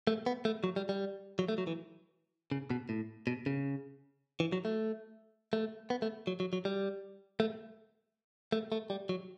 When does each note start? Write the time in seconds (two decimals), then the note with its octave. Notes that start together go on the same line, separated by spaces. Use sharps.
0.07 A3
0.26 B3
0.45 A3
0.64 F#3
0.76 G3
0.89 G3
1.39 F#3
1.48 A3
1.58 F#3
1.67 E3
2.52 C#3
2.70 B2
2.89 A2
3.27 B2
3.46 C#3
4.40 E3
4.52 F#3
4.65 A3
5.53 A3
5.90 B3
6.02 A3
6.27 F#3
6.40 F#3
6.53 F#3
6.65 G3
7.40 A3
8.52 A3
8.72 A3
8.90 G3
9.09 F#3